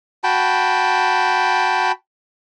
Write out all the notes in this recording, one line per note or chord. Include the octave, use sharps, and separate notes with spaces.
F#4 G5 A5 B5